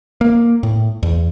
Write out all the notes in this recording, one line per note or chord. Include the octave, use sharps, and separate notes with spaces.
A#3
A2
E2